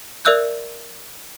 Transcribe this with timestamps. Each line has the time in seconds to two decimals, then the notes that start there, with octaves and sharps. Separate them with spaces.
0.25 A#4 D5 E5 E6 F#6 G6